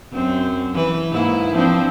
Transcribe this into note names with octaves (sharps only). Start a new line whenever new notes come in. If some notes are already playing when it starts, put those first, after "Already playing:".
F#2 C4
E3 B4
G#2 A#3 E4
F3 C4 D4